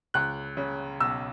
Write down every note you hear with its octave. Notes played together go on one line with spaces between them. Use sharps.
C#2 F#6
C#3
B1 E6